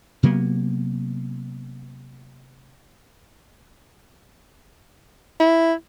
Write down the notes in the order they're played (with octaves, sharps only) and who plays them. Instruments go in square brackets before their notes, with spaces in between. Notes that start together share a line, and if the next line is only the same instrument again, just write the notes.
[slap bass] C3 F#3 A#3 B3
[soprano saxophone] E4